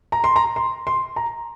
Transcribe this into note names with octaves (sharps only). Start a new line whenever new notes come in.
A#5
C6
A#5
C6
C6
A#5